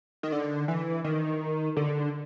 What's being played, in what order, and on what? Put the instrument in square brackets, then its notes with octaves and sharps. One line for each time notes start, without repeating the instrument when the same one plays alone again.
[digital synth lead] D#3
D3
E3
D#3
D3